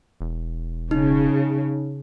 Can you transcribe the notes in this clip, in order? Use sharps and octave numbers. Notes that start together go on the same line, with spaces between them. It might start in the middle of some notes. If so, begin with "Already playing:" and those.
E1
C#3 D#4